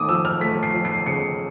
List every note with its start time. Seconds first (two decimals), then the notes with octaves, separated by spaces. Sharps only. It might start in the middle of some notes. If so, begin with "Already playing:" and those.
Already playing: D#2 A3 D6 D#6
0.09 F3 E6
0.25 F6
0.41 A3 B6
0.63 C7
0.74 F3
0.85 C7
1.06 C#3 C#7